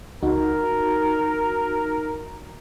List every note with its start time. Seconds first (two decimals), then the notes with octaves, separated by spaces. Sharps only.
0.23 C#2 D#4 F#4 A#4